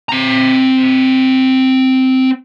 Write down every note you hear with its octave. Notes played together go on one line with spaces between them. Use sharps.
C4 A#5